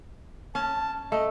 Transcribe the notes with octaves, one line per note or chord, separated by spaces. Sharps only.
C#4 A5
A3 D#5